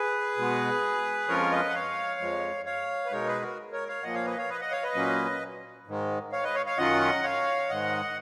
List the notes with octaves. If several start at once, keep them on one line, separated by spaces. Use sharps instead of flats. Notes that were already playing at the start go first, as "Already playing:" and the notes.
Already playing: G#4 B4
B2 G#3 B3
F2 F3 G#3 C#4 F4 A#4 C#5
B4 D#5
F#5
C#5 F5
F2 F3 G#3
C#5 F5
B4
B2 G#3 D#4 A#4 C#5
G#4 B4
F#4 A#4
A#4 C#5
C#5 F5
A#2 F3 A#3 D#5 F#5
C#5 F5
B4 D#5
C#5 F5
B4 D#5
D#5 F#5
C#5 F5
B4 D#5
A#2 F#3 A#3 C#4
G#2 D#3 G#3
C#5 F5
B4 D#5
C#5 F5
C#5 F5
F#2 D#3 F#3 C#4 F4 D#5 F#5
C#5 F5
G#2 D#3 G#3 D#5 F#5